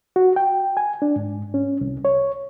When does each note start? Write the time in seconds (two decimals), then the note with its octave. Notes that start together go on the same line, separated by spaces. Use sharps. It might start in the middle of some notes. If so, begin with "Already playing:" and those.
0.16 F#4
0.36 G5
0.77 G#5
1.02 D4
1.16 G#2
1.54 C#4
1.81 C2
2.05 C#5